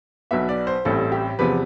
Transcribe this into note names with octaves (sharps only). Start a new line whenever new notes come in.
B1 B2 B3 E5
D5
C5
A1 A2 G3 C4 A4
G4
E2 C3 F3 B3 B4